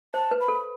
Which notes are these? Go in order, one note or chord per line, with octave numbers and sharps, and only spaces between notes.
C5 A5
B4
B5
A4